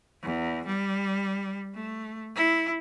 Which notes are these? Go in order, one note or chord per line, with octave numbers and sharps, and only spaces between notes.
E2
G3
A3
E4